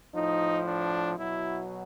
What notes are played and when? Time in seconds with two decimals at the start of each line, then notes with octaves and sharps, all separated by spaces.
0.15 A2 F3 D#4
0.65 D4
1.16 B2 F#3 E4